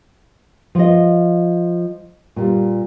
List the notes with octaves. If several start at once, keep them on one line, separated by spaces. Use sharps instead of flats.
F3 D#5
A#2 G3